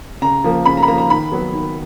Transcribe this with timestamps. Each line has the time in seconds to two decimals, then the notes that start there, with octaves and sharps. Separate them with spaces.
0.22 C#3 A#5
0.44 F3 A#3
0.65 C#3 B5
0.77 A#5
0.83 B5
0.88 F3 A#3 A#5
0.98 A#5
1.10 D#3 B5
1.32 F#3 B3
1.53 D#3